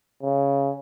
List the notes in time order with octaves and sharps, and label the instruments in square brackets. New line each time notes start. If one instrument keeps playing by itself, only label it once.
[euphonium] C#3